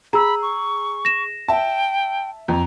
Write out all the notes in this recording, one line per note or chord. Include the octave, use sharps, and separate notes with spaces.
G#4 A#5 B5 E6
C#6
A#6 E7
E5 G5 A5
F2 A#5